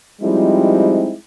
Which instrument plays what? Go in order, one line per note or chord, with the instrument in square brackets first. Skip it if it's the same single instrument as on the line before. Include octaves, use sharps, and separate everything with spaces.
[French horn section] F3 G3 G#3 C4 D#4 E4